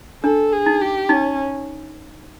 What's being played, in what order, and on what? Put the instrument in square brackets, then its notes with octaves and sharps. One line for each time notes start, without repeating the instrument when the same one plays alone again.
[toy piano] D4 [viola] A4
[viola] G#4
[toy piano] D#4
[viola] G4
[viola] C#4 [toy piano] D#4